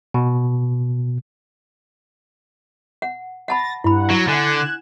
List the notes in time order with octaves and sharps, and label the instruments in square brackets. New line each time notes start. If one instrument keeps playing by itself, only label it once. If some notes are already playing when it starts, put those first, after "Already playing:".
[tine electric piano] B2
[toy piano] F#5
[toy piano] F#5 A5 B5 [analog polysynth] A6 A#6
[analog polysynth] G2 F#5 [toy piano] E4 B5
[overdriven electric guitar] F#3
[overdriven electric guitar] D3 [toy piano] F#5 G#5 [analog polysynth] F#6 G#6 E7